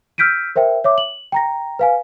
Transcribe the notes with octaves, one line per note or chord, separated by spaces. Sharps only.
E6 F6 G6 B6 D7 D#7
A#4 C5 E5 G5
C#5 E5 D6
F#7
G5 A#5 A#6
B4 F5 G#5